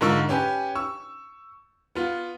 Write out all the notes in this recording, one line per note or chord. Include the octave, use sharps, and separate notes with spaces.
G#2 D3 F4 A#4 C#6 E6
C#4 G4 B4 G#5
C#6 E6
B3 F4